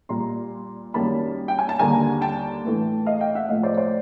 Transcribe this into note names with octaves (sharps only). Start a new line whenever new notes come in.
A#2 G3 A#3 A#5 C6
F#2 D#3 G3 A#3 A5 B5
G5
G#5
A5
D#2 D3 G3 A#3 G#5 A#5
G5 A5
A2 E3 A3
D#5 F5
F5 G5
E5 F#5
A2 F3 A3 D#5 F5
C5 D5
C5 D5